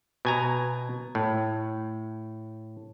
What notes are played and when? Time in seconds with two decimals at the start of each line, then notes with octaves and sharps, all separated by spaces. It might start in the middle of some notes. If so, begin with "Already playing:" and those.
0.25 B2 G#5 A#5
1.15 A2